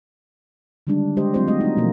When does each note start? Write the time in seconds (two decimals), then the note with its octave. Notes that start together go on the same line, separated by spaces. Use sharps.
0.87 D3 D#3 G3 G#3 D4
1.17 G#3 G4 C5 D#5
1.34 F#3 G#3 C4 F4 C5 D5
1.47 A3 C4 F#4 D#5
1.61 A3 D#4
1.77 B2 E3 F3 A#3